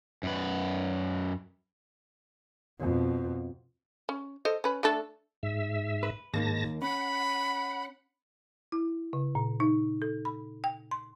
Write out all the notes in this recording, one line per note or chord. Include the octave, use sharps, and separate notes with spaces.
F#2 B4
F2 B2
C#4
A4 C5 D#5
C#4 B4
A3 D4 A4
G#2 E5
B4
D#2 G#2 A#3 D#4 A5 A#6
C#4 F#5 B5
E4
C#3
A#2
D#4
A4
B5
G5
C6